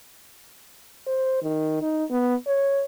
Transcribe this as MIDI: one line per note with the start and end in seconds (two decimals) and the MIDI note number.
1.07 1.39 72
1.42 1.79 51
1.82 2.04 63
2.10 2.34 59
2.47 2.84 73